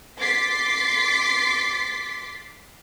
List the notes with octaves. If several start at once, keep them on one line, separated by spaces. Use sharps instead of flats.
C6 D6 A6 B6 C7